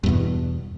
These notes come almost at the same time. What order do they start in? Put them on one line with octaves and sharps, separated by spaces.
G2 E2 B2